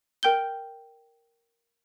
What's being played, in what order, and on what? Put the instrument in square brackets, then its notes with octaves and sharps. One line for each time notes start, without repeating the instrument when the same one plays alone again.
[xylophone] A#4 G5 G6 G7